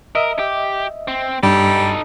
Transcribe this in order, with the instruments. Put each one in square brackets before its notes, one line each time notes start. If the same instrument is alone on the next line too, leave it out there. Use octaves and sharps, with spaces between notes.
[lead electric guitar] A#4 [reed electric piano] D#5 E5
[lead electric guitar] G4
C4
[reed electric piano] G2 [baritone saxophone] G3 [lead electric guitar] D#4 A4